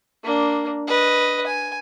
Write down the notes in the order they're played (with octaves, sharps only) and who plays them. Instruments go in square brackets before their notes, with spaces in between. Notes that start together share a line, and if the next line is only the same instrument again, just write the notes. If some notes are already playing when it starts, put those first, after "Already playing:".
[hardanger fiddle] A#3 D4
B4 D#5
G#5